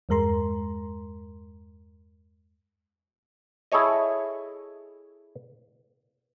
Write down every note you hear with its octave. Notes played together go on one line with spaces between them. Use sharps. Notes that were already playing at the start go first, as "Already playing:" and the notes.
E2 G2 G#3 A#4 A#5 C6
E4 G#4 A4 C#5 D#5